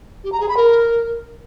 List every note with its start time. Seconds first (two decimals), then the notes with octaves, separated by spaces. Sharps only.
0.24 G4
0.32 A#5
0.40 G#4
0.49 B5
0.57 A#4